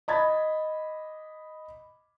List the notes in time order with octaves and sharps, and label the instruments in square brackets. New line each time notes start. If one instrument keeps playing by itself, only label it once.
[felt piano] D#5 B5 G#6 A6